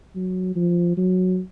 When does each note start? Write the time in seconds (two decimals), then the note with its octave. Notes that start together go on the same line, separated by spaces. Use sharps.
0.15 F#3
0.56 F3
0.97 F#3